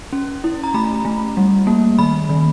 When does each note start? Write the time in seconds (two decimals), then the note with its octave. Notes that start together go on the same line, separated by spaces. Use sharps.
0.13 C#4
0.44 E4
0.64 A#5
0.74 A3 B5
1.05 A3
1.37 G3
1.67 A#3
1.99 D#3 B5
2.29 D#3